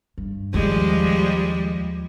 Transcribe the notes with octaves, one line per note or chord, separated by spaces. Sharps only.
G2
D#2 F3 G3 G#3